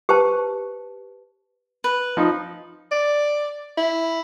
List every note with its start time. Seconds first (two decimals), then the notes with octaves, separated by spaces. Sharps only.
0.09 G4 B4 C5 A5
1.84 B4
2.17 F3 D#4
2.91 D5
3.77 E4